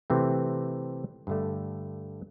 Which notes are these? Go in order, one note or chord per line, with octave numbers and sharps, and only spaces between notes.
C3 E3 A3 C4
G2 D3 A3